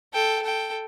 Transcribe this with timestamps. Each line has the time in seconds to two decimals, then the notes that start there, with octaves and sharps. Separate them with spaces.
0.14 A4 G5
0.42 A4 G5